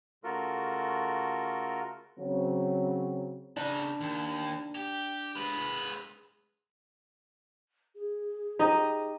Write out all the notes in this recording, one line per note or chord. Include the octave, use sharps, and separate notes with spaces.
C#3 A3 F4 F#4 A4 A#4
C#3 F#3 C4
C#3 D4 D#4
D#2
G4
G#3 B4
G#4
D#4 G4 D#5